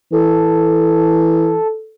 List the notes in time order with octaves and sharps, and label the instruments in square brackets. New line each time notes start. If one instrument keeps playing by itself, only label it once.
[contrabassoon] E3 [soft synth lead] A4